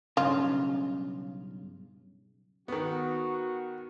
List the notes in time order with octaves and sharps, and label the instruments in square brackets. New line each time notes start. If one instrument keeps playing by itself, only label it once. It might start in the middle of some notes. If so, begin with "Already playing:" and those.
[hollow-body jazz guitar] B1 G2 C#3 [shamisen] F4
[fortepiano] D#3 B3 [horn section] F#4